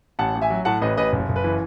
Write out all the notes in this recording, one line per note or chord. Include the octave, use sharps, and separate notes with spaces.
A1 F#5 A5
A1
E5 G#5
F#3
A2 F#5 A5
A1 B4 D#5
A1 B4 D#5
F#1
F#1
B4
E3